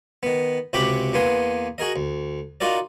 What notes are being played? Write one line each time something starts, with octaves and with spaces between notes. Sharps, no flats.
D#3 B3
C#2 C3 F#4 G4 B5 D6
E2 A#3 B3 G#5 C6
F#4 G#4 A#4 D#5
D2
D#4 F4 F#4 A#4 D5